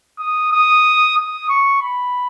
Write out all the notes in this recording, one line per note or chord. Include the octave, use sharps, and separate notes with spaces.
D#6
D#6
D#6
C#6
B5